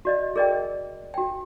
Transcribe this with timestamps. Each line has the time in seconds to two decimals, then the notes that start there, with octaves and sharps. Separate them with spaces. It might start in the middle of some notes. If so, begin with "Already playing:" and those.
0.05 F#4 D5 D#5
0.36 G#4 A#4 D5 D#5 G5
1.14 F#4 G5